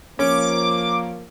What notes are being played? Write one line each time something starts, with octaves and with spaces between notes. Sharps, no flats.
F3 A#3 C#4 D6